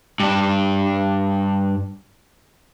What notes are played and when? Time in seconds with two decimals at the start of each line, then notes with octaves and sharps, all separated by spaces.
0.20 G2 D4